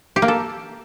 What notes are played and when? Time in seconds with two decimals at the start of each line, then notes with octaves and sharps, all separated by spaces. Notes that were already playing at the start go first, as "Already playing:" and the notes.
0.16 G4
0.22 A#3
0.28 A4